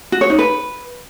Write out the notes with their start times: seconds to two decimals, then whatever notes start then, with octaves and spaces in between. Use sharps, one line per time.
0.12 F#4
0.21 C#5
0.30 D#4
0.39 B4